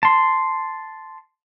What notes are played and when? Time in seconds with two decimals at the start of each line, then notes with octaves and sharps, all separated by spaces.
0.03 A5 C6